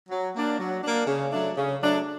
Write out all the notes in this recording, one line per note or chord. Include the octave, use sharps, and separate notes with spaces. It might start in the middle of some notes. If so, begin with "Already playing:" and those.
F#3
A#3 D4
F#3
A#3 D4
C#3
F#3 A3 D4
C#3
F#3 A3 D4